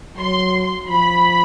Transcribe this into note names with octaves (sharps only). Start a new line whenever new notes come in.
F#3 C6
F3 B5